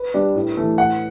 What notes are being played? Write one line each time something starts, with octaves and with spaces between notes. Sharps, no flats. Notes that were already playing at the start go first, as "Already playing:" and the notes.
Already playing: B4
G3 D4
A2
E3 A3
A2 F#5